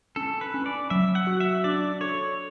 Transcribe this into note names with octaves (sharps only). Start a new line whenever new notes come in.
C#4 A4
B4
C#4
D5
F#3 E5
F#5
F#4
E5
D4 D5
A4 C#5